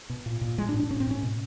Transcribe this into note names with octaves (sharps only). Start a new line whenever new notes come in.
B2
A#2
A#2
A2 G#3
D4
A2
D4
A2 C#4
C4
A2 C#4
B2